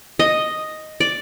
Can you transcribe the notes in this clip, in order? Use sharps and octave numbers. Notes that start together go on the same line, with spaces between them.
D#5
D5